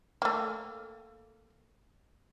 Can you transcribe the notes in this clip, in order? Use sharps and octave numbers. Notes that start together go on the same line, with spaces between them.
A3 A#3